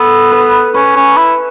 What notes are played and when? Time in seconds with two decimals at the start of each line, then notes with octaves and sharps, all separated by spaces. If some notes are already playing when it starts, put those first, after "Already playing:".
Already playing: B3 A4
0.32 B4
0.74 C#4 B4
0.96 C#4
1.17 E4